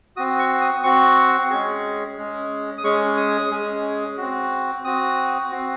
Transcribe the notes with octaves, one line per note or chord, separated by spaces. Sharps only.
C4 F#4 D#6
C#6
D#6
C4 F#4 C#6
G#3 C#4 G#4
G#3 C#4 G#4
D#6
G#3 C#4 G#4 C#6
D#6
G#3 C#4 G#4
C4 F#4
C4 F#4 D#6
C4 F#4